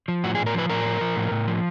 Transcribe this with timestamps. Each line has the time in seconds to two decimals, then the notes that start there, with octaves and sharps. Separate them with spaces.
0.08 F3
0.24 A2 F#4
0.35 A2 G#4
0.46 A#4
0.54 F3 B4
0.70 A2 A#4
0.85 F3
1.01 F3
1.16 A2
1.31 A2
1.47 F3